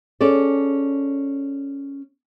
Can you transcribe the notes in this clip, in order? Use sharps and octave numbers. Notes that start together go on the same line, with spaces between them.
C#4 G#4 A4 D5